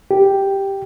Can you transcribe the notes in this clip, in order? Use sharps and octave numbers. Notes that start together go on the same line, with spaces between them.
G4